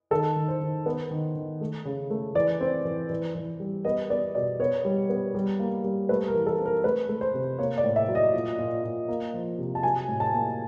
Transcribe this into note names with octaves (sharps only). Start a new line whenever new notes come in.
D#3 A4
D#3
C5
D#3
B3
D#3
D#3
A3
C#3
A3
E3 D5
C4
E3
E3
E3
G3
B3 D#5
B3 D5
B2 D5
B3 C#5
G3
B3
G3
A#3
G3
A3 B4
A#4
E3
A4
C4
A#4
A3 B4
A3
C5
C3
A#3 C#5
D5
A2
E5
F#3
D#5
A#2
A#2
A#2
A#3
F3
C3
A5
F#3 G#5
A2
A5
A#3